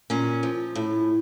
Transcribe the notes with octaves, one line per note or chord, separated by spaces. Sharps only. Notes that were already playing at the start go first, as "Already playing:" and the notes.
A#2 C#4
F3
A2